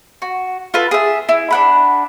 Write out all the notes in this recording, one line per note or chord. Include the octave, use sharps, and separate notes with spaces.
F#4
F4 A4 B4
G#4 E5
E4
D4 F#5 B5